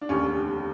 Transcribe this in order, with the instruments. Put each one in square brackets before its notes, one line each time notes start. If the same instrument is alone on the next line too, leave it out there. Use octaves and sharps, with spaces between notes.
[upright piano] D4
F1 D#2 D3 C#4